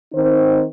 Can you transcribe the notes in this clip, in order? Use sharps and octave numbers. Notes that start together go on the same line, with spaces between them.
D#3 C4 D#4 C5